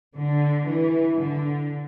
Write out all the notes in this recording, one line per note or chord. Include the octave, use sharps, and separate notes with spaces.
D3
E3
D3